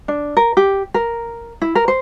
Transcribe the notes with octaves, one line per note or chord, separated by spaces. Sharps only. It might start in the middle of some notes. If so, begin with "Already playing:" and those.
D4
A#4
G4
A#4
E4
A#4
C5